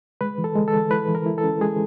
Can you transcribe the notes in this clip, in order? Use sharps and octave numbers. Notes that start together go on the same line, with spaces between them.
G#3 B4
E3
A4
G#3
A4
E3
E4 B4
E3
A#4
E4
A4
C#4
G#3 G#4